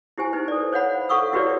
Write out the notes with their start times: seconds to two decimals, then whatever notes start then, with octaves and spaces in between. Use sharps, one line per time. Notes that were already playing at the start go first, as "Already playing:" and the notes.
0.18 E4 G4 C5 G#5
0.33 D#4 B4 C5
0.48 A4 D5
0.73 C5 C#5 F5 F#5 B5
1.09 A4 F5 F#5 C#6 D#6 E6
1.33 E4 F#4 G4 B4 C#5 D5